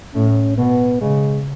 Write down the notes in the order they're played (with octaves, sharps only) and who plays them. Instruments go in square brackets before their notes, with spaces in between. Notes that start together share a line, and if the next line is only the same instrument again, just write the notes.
[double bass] A2 [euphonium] C#4
[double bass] B2 [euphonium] B3
[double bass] C#3 [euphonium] G#3